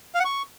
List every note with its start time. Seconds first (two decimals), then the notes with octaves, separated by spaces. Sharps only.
0.15 F5
0.20 F#5
0.25 C#6